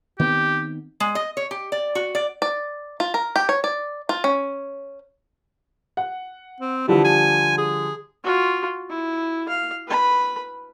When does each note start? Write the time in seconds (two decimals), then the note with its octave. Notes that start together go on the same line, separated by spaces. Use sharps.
0.19 D#3 B3 C4 G4
1.00 G#3
1.15 D#5
1.37 C#5
1.51 G4
1.72 D5
1.95 F#4
2.15 D5
2.42 D5
3.00 F4
3.14 A#4
3.36 G4
3.49 C#5
3.64 D5
4.09 F4
4.24 C#4
5.97 F#5
6.60 C4
6.88 D3 E3 F3 G3
7.04 G#5
7.58 G#4
8.24 F4 F#4
8.90 E4
9.49 F5
9.87 B4 B5